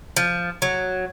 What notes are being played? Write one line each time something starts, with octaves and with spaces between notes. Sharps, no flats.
F3
F#3